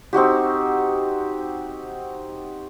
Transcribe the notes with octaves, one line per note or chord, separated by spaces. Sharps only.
C4 D#4 F#4 G4